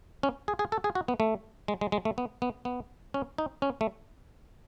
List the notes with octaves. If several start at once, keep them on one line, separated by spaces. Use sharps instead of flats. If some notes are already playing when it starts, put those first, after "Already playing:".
C#4
G#4
G#4
A4
G#4
F#4
B3
A3
G#3
G#3
G#3
A3
B3
B3
B3
C#4
D#4
C#4
A3